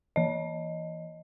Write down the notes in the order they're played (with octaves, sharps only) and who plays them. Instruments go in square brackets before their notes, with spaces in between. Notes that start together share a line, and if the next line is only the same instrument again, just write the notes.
[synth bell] E3 D#5